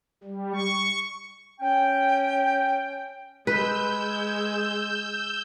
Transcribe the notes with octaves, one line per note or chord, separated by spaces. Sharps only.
G3
C#6
C#4 G5
G#3 B4 E6 G6